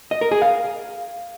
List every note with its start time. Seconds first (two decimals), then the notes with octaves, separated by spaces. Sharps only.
0.11 D#5
0.21 A#4
0.32 G#4
0.42 F5